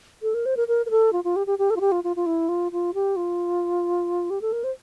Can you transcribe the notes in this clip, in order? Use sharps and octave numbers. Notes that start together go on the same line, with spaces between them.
A4
A#4
C5
A#4
A#4
A#4
A4
F4
F4
G4
G4
G4
A4
F4
G4
F4
F4
F4
E4
F4
F4
G4
F4
G4
A4
A#4
C5